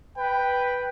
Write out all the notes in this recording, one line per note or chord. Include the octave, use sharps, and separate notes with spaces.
B4 G5